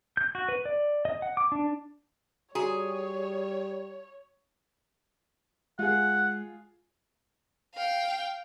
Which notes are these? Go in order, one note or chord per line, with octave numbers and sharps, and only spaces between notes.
G6
F#4
B4
D5
D#5
F#5
D6
D4
G3 F#4 G#4 C#5 A#5
G#3 F4 G#4 F#5
F5 G5